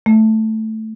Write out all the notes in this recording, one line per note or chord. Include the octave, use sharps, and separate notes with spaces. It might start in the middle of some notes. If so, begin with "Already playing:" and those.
A3